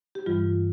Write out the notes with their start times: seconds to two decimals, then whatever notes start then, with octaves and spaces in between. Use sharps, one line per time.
0.15 G4
0.26 G2 E3 G3 F4